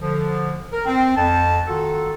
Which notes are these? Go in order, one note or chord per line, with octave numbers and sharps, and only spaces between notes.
D3 F3
A#4
C4
F2 A5
D#3 F4 F#4 A4